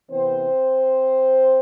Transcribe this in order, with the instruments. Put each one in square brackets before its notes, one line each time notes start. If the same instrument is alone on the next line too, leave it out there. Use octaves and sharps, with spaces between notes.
[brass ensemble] C3 E3 B3 C4 C5